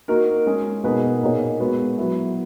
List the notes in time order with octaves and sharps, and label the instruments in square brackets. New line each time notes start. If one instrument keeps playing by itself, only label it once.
[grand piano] A#3 D#4 F#4 A#4
G#3 C#4 G#4
B2 A#3 D#4 G#4 B4
A#2 A#3 D#4 G#4 C#5
G#3 B3 F#4 B4
F#3 B3 E4